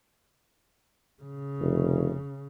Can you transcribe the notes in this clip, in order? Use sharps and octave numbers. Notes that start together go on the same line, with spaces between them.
C#3
F1